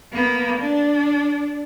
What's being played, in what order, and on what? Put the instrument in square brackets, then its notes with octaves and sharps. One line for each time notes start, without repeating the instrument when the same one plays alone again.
[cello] A#3 B3
D4